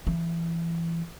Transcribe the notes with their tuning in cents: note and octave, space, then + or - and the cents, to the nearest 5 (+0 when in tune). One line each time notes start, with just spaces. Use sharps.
E3 +25